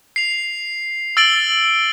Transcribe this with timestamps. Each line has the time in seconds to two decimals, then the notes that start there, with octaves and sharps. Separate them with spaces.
0.16 C7 F7
1.17 E6 A6 D7 F#7 G7